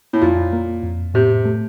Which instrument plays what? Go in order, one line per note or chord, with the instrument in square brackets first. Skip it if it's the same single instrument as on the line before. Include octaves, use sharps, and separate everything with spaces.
[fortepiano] A2
[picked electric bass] F2 [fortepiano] A#2
[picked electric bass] A#3
F2
[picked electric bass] A2 [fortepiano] C3
[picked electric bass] A3